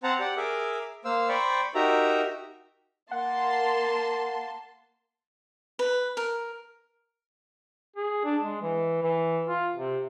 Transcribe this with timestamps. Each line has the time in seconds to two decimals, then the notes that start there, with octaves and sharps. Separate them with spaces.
0.03 C4 C5 F#5 A5 A#5
0.19 G4 D5 F#5
0.37 G#4 A#4 E5 D6
1.05 A#3 C5 F5 E6
1.29 C5 D5 G5 B5 C#6
1.75 D#4 F#4 G4 A#4 E5 A#5
3.11 A#3 F#5 A5 C6
5.79 B4
6.17 A#4
7.96 G#4
8.24 D4
8.42 G#3
8.62 E3
9.03 E3
9.47 F4
9.75 C3